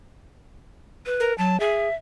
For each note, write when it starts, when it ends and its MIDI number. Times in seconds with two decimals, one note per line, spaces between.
1.06 1.33 71
1.20 1.36 70
1.38 1.60 54
1.38 1.59 81
1.60 1.88 68
1.60 1.94 76